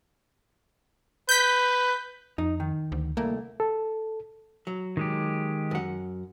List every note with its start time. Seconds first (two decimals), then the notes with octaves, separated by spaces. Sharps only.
1.29 B4 G6 B6
2.38 F2 D#4
2.60 D#3
2.92 D2
3.17 C2 A3 A#3
3.60 A4
4.67 F#3
4.97 D#3 G#3 G4
5.71 F#2 F#5